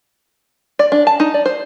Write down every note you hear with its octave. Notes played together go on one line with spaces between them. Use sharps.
D5
D4
A5
D#4
D5
C5